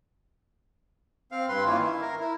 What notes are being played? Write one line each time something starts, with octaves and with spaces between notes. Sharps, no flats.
C4 F5
G2 B4 C6
D#3 A#3 C#4 E4 F4
E4
A#4
E4